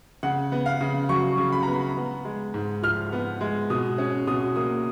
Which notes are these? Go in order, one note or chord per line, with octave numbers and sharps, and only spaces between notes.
C#3 F#5
B3
F5
C#3
F#3 C#6
C#3
B5
B3 A#5
B5
B3
G#3
G#2
F3 F6
B3
G#3
B2 D#6
C#4
B2 D#6
A#3 D#6